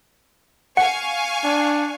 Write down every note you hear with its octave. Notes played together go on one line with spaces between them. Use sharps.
F5 F#5 G#5 C#6
D4